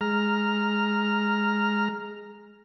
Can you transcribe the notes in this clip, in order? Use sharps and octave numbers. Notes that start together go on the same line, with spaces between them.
G#3 A#5 F6